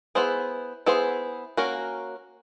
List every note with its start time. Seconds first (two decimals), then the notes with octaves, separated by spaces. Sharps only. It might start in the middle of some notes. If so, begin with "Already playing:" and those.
0.15 B3 E4 G#4 C5
0.86 B3 E4 G#4 C5
1.57 A#3 C#4 F#4 A#4